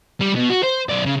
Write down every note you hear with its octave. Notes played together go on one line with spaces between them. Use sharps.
G3
B2
F#4
C5
B1 D5
C#3